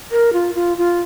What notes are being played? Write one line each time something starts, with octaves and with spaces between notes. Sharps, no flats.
A#4
F4
F4
F4